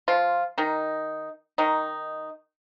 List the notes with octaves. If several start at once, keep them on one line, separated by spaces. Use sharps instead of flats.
F3 F4
D#3 D#4
D#3 D#4